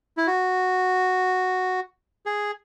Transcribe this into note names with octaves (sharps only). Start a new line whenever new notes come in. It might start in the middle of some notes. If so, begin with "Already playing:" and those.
E4
F#4
G#4